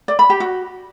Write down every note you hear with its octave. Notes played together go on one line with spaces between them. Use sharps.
D5
B5
G4
F#4